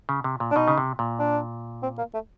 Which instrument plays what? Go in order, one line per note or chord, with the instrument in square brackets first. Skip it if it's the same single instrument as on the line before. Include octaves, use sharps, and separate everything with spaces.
[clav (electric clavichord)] C#3
C3
A#2
[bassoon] D4
[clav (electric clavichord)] B2 [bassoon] D#4
[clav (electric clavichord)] C#3
C3
A#2
[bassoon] D4
C4
A#3
A3